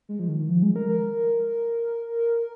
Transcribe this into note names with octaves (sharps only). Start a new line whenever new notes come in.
G#3
F3
D#3
D#3
F3
G#3
A#4
A#4